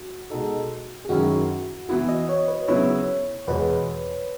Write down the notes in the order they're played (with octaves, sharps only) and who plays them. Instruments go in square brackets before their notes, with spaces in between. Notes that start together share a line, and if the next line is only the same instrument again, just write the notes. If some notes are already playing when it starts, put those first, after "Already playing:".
Already playing: [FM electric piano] F#4
[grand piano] B2 G#3 D#4 A4
[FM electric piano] G#4
[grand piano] F#2 D#3 G#3 C#4 E4 [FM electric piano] F#4
[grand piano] E3 B3 E4 [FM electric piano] F#4
[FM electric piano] D#5
C#5
B4
[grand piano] C#3 F#3 B3 E4 [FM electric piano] C#5
[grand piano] E2 B2 G#3 [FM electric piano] B4